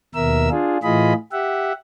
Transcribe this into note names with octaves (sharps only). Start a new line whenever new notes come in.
D#2 B2 A#4 E5 E6
D4 F4 G#4
A2 E3 F4 G#4 D#5 B5
G4 E5 F#5